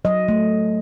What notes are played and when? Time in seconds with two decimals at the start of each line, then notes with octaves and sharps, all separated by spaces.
0.05 F#3 D#5
0.28 A3